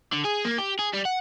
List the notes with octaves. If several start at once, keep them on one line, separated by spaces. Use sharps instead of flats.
D3
G#4
A#3
G4
G#4
G3
F#5